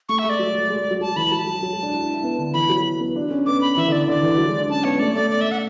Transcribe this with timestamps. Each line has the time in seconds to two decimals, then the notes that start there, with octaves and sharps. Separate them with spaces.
0.09 A3 C#6
0.19 E5
0.24 G#3
0.30 D5
0.39 F#3
0.55 F#3
0.70 G#3
0.81 G#3
0.91 F#3
1.01 F#3 A5
1.16 E3 B5
1.32 F#3 A5
1.47 F#3
1.62 F#3
1.72 G#3
1.82 D4
1.93 E4
2.03 D4
2.13 E4
2.23 B3
2.39 D3
2.54 E3 B5
2.70 F#3
3.00 B3
3.16 D4
3.31 C#4
3.46 B3 D6
3.61 B5
3.77 E3 E5
3.87 D3 D5
4.07 D3 D5
4.23 E3
4.38 F#3
4.49 G#3
4.59 D4
4.69 C#4 A5
4.84 B3 C#5
4.99 A3 D5
5.15 A3 D5
5.30 D5
5.41 E5
5.52 F#5